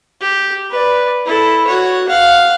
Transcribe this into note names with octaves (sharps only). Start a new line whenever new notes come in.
G4
B4 D5
E4 A4
F#4 C#5
F5 F#5